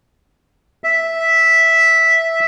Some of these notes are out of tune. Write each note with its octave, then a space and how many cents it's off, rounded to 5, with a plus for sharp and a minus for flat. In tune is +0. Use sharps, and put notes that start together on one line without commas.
E5 -5